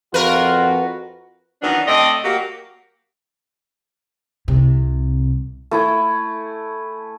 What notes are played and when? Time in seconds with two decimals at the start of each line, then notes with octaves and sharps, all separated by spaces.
0.14 F2 F4 F#4 A#4 B4
1.62 D#3 E3 F#3 B3 C#4 D4
1.87 A2 A3 C4 D5 D#5
2.24 F#3 A#3 F#4 G4
4.48 C2 C3
5.71 A3 E4 G#5